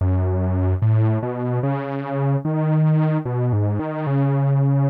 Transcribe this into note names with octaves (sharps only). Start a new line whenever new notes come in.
F#2
A2
B2
C#3
D#3
B2
G#2
D#3
C#3